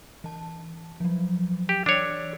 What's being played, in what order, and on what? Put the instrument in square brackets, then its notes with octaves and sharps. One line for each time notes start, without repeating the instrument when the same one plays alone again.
[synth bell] E3 A5
F3 F#3
[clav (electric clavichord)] G4
[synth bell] E3 E6 [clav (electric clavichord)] D4 C#5